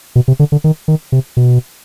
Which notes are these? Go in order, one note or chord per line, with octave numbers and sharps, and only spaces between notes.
B2
C3
D3
D3
D#3
D#3
C3
B2